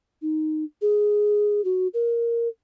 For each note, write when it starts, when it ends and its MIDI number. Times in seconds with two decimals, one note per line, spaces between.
0.22 0.64 63
0.82 1.64 68
1.65 1.88 66
1.94 2.48 70